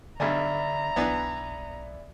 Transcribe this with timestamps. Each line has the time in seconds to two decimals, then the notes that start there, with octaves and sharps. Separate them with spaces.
0.20 B1 G2 D3 D5 E5 G#5 A#5 B5
0.96 B1 E3 B3 D4